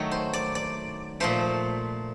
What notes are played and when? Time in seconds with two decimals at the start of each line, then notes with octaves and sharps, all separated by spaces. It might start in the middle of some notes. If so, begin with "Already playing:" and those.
Already playing: D#3 F#3 A3
0.11 C5
0.33 D5
0.55 D5
1.20 A#2 F3 A3 C5